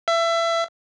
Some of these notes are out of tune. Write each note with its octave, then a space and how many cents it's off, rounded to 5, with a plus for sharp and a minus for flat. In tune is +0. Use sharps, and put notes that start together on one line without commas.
E5 +25